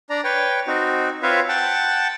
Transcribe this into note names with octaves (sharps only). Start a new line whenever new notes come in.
D4 D5 A#5
B4 C#5 G5
C4 D#4 F#4
C4 F4 B4 C#5 E5 F5
F#5 G5 A5